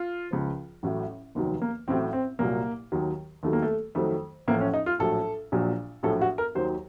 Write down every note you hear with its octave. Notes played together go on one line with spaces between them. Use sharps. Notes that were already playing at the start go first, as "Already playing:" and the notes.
Already playing: F4
C#2 C#3 F3
A1 A2 F#3
F1 D#2 D#3 F#3
A#3
A1 A2 F#3 C4
C4
C2 A#2 F#3 A#3
D#2 D#3 F#3
D#2 D#3 F#3 A3
A#3
A3
F2 D#3 F#3 A3
A1 A2 F3 A#3
C#4
D#4
F4
A#1 A2 F#3 A4
A#1 A#2 F#3
A#1 A2 F#3 A4
F#4
A#4
D#2 D#3 F#3 C5